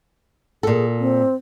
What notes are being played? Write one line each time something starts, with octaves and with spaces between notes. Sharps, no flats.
A#2 G#4 A4
C4